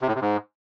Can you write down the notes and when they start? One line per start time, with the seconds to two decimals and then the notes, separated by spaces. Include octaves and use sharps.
0.01 C3
0.08 A2
0.15 C3
0.22 G#2